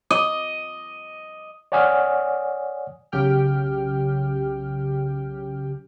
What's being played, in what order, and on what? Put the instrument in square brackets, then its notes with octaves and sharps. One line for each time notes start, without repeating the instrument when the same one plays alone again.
[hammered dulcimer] D#5
[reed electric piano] C#5 D5 F#5 G#5 D#6 F6
[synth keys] B1 C#3 F#3 G4 G5 F6